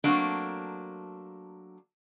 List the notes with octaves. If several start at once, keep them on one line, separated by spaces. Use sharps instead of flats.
F#3 A3 A#3 C4 D4